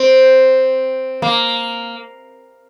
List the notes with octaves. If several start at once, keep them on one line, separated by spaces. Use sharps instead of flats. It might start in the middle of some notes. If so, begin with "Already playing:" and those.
Already playing: C4
A#3